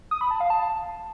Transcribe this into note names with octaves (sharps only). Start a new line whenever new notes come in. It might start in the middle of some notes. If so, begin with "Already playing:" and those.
D#6
B5
A5
F5
A5